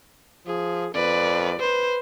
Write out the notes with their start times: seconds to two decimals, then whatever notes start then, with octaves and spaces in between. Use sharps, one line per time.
0.47 F3 G#4
0.95 F2 B4 D5
1.60 B4 C5